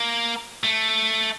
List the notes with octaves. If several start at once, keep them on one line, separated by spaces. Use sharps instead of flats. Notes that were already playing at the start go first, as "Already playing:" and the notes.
Already playing: A#3
A3